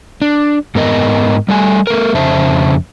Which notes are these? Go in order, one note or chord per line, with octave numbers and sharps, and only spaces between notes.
D4
G#2 B3 A#4 D#5
G3 A3 G#5
A3 A#4
F2 C#3 C5 E5 A5